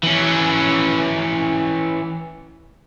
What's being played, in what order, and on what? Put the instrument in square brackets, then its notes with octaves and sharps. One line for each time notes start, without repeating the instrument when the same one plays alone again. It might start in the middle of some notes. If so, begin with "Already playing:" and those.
[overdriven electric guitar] E3 C#4